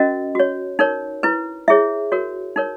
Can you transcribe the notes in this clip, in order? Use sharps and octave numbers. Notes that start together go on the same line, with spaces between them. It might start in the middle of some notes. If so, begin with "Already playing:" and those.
Already playing: C#4 F#4 A#4 D#5
F#4 C#5
D#4 A#4 C#5
E4 B4
E4 G#4 C#5 E5
F#4 A#4 C#5
D#4 A#4 C#5